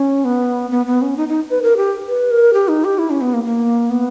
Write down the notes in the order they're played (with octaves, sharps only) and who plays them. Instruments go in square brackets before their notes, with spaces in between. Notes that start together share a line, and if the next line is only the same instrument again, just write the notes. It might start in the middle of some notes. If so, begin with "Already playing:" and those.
Already playing: [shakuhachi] C#4
B3
B3
B3
C#4
D#4
D#4
B4
A#4
G4
B4
A#4
G4
D#4
G4
E4
C#4
B3
A#3
A#3
B3